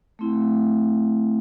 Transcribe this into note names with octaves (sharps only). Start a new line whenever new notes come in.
A3 C4 E4